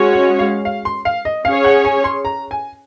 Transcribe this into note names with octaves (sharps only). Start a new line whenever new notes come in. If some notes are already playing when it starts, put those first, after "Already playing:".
Already playing: G#3 C#4 F#4 C#5
F#5
F5
F5
C6
F5
D#5
C#4 G#4 C#5 F5
F#5
G#5
C6
A#5
G#5